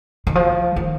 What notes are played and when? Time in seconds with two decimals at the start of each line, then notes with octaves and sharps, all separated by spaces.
0.27 D#3
0.35 F3
0.76 D#3